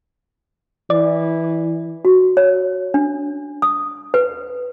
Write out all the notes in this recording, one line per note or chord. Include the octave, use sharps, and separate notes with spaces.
E3 D5
F#4
C#5
D4
D#6
B4